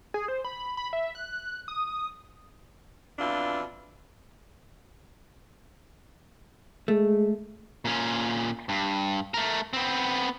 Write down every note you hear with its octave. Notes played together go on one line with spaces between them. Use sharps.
G#4
C5
B5
B5
E5
F#6
D#6
F2 B2 E3 D4 F4
G#3 A3
A#2 C#4
G2
A3 A#4
B3 C4